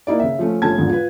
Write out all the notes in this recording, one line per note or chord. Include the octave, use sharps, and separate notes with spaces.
A#3 D#4 E4 D5
C#3 E5
F3 A3 C#4
G1 F3 A3 C#4 A5 G#6
E2 G#2 D3 F3
F4 B4